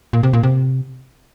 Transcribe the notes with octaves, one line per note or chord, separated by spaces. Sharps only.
A#2
C3
A#2
C3